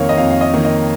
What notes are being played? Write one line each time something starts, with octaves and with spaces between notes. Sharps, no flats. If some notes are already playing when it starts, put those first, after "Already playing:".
Already playing: F2 D#3 A#3 C#5 F5
D#5
F2 F5
F5
D#5
D#3 A#3
D#5